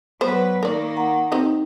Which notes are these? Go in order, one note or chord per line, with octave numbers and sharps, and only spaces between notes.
F#3 B3 B4 C5
D#3 A#3 A#4 D5
F#5 A#5
C4 D#4 G4 D#5